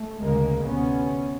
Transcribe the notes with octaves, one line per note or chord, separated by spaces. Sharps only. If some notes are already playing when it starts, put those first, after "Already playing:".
Already playing: A3
D2 C#3 G#3 A#3
D2 C3 B3 C#4